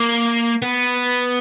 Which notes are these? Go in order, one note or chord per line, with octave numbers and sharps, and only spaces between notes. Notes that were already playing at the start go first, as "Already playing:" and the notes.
Already playing: A#3
B3